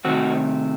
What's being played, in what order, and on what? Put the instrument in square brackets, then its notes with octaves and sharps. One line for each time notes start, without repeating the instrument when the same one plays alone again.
[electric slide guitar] C3 D#3 A3 C4 F#4